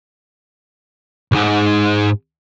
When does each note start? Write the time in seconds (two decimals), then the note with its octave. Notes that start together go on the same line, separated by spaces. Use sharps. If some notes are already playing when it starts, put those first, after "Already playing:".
1.32 B1 G#2